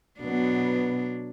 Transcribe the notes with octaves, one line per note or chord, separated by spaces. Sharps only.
B2 F#3 B3 D4